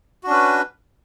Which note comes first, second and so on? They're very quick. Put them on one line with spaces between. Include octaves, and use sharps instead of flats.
F#4 D4 C#4 B4